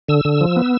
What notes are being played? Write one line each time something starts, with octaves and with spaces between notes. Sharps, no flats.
D3 E6
D3
F3
B3